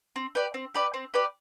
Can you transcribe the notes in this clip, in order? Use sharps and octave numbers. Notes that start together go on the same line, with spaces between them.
C4
G4 B4 D5
C4
G4 B4 D5
C4
G4 B4 D5